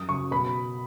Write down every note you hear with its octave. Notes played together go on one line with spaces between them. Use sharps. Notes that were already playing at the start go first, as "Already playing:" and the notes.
Already playing: F#2 D#6
C#3 F#3 C#6
B2 B5